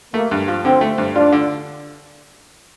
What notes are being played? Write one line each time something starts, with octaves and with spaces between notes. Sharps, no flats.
A3 A#3
G2
F3
D3 C4
A3
G2
D4 F4
D3